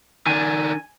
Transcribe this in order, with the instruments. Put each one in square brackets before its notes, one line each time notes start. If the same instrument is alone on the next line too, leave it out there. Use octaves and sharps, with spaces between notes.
[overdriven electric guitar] D#3 D4 [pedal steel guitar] G#5